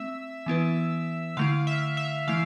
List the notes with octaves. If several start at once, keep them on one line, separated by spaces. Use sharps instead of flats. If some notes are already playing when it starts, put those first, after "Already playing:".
Already playing: A3 C4 E5
E3 B3 E4 B4
D3 A3 E4 F5
E5
E5
E3 A3 E4 F5